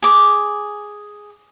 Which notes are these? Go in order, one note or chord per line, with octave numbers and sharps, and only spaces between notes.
G#4 D6